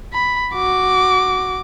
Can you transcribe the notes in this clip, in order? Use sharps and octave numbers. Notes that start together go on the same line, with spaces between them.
B5
F#4 D6